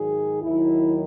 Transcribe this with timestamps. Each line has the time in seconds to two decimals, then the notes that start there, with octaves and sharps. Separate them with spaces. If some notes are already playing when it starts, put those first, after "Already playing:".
Already playing: G#2 D#3 F#3 G#4
0.42 D#2 D#3 F#3 E4